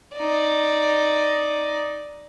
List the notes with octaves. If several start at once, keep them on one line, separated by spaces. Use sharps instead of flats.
D#4 D5